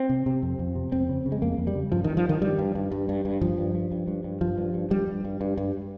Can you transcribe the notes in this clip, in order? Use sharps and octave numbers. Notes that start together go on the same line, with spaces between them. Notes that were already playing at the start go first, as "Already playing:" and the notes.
Already playing: C4
C3
C3
F2
F2
C3
F2 C4
C#3
C#3
G#3
F2 A#3
F2
G3
C#3
G2 F3
G2 D#3
F3
G2 D#3
G2 G3
G2
G2
G2
G2
G2
G2 F3
G2
G2
G2
G2
G2
G2 F3
G2
G2
G2 G3
G2
G2
G2
G2